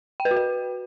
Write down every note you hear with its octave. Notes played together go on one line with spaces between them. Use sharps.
G5
B4
F#4
B4